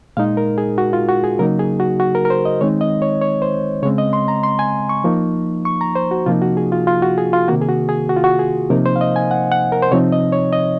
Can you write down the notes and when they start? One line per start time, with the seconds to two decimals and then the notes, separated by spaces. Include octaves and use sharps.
0.17 A#2 G#3 D#4 F5
0.37 A#4
0.58 G#4
0.78 F#4
0.93 F4
1.09 F#4
1.24 G#4
1.39 C#3 F#3 A#3 D#4 A#4
1.59 G#4
1.80 F#4
2.00 F#4
2.15 A#4
2.25 A#4
2.30 C5
2.45 D#5
2.61 D#3 G#3 C4 D#4 C#5
2.81 D#5
3.02 C#5
3.21 C#5
3.42 C5
3.83 C#3 G#3 C4 C#5
3.98 D#5
4.13 C6
4.28 A#5
4.43 C6
4.59 G#5
4.89 C#6
5.04 F3 A#3 D#4
5.65 C#6
5.81 A#5
5.96 C5
6.11 F#4
6.26 C3 F3 A#3 D#4 F4
6.42 F#4
6.57 G#4
6.72 F4
6.87 F4
7.02 F#4
7.18 G#4
7.33 F4
7.48 C3 D#3 A#3 F#4
7.62 G#4
7.69 F#4
7.89 G#4
8.09 F#4
8.16 F4
8.24 F#4
8.39 G#4
8.70 C3 F3 A#3 D#4 A#4
8.86 C5
8.96 F5
9.01 D#5
9.16 G#5
9.31 F#5
9.52 F#5
9.72 A#4
9.82 C5
9.92 C3 F3 C4 D#4 C#5
10.12 D#5
10.32 C#5
10.53 D#5